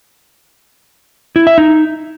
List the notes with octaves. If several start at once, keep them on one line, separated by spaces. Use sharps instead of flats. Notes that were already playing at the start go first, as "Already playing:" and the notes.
E4
E5
D#4